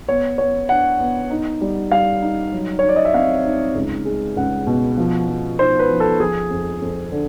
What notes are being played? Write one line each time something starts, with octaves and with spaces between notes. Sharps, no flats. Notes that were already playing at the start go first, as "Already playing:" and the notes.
B3 C#5
B3 C#5
D4 F#5
B3
D#4
G3
G3 F5
D#4
F#3
C#5
D#4
D5
D#5
E5
C4 F5
D#4
C#2
G#3
C#2 F#5
B2
F3
F3
D#4 C5
B4
F3
A4
F3 G#4
F2
F2
D3